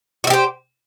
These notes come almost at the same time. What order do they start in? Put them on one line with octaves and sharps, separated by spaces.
F#4 E4 G4 C5